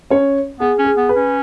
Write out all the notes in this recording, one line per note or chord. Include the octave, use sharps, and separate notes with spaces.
C#4 C#5
B3 G#4
C#4
G#4
B3
B4
C#4